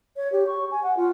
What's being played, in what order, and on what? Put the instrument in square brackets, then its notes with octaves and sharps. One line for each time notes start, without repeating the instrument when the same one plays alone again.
[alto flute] C#5
G4
C#6
G#5
F#5
F4